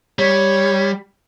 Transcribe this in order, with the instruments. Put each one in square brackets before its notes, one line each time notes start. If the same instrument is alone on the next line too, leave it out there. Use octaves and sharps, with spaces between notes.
[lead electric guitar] G3 [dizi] C#5